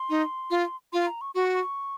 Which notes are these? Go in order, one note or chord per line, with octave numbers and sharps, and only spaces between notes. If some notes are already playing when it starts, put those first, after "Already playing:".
Already playing: C6
D#4
F4
F4 C6
A#5
C#6
F#4 C#6
C#6